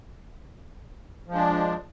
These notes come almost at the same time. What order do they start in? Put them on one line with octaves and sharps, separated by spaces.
F3 G#3 D4